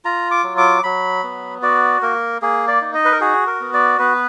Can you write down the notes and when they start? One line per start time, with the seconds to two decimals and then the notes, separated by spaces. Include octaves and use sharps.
0.05 F4 A#5
0.31 D6
0.44 F#3
0.58 D6
0.83 F#3 B5
1.24 B3
1.62 F#4 D5
2.02 A#3 A#4
2.42 A#3 G#4
2.68 D5
2.81 D#4
2.94 D#5
3.05 B4
3.12 A#4
3.21 F#4 G#4
3.47 A#4
3.60 B3
3.74 D5
3.99 B3 B4